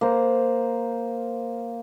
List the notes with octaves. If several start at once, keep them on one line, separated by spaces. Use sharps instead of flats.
A#3 C5